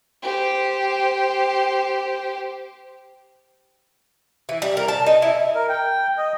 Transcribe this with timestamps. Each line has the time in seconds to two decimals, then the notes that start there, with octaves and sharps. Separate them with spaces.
0.22 G4 C5
4.49 E3
4.62 G3
4.77 A#4
4.88 A5
5.06 D#4
5.22 E4
5.55 A#4
5.69 G5
6.18 D#5